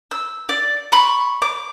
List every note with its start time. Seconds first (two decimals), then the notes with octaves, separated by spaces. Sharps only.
0.11 E6
0.49 D5
0.92 B5 C#6
1.42 D6